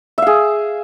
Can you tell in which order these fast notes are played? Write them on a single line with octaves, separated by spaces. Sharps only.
E5 F5 G#4